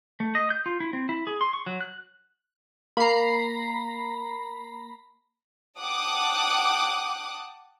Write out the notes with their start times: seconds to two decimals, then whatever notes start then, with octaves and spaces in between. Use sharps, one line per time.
0.20 A3
0.35 D#5
0.50 G6
0.66 F4
0.80 E4
0.93 C4
1.09 E4
1.27 G#4
1.41 C6
1.53 C#6
1.66 F#3
1.81 F#6
2.97 A#3 A#5 B5 C7
5.80 F#5 G5 A5 D6 D#6 F#6